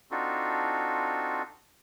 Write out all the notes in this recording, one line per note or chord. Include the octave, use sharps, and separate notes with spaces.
C4 D4 D#4 F4 F#4 A4